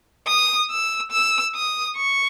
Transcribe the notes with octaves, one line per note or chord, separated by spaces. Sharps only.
D#6
E6
E6
D#6
C#6